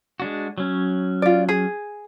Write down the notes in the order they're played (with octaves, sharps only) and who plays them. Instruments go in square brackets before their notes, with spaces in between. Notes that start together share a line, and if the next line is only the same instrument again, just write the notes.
[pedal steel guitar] G#3 D4 F#4
F#3 C#4
[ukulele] F4 D5
G#4